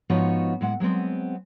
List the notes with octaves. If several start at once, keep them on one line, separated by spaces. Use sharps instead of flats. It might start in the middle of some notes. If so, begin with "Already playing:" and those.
G#2 F3 B3 D#4 F#4 C#5
A2 G#3 F#5
F#3 G#3 B3 C4